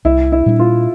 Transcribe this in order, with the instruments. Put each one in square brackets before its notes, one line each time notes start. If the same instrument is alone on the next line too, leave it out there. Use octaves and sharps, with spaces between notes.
[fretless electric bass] C2 [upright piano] E4
[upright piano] E4
[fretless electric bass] A#2 G3 D4
[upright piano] F4